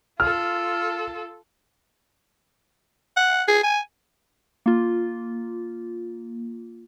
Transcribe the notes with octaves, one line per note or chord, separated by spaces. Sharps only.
F4 A4 F6
F#5
G#4
G#5
A#3 F4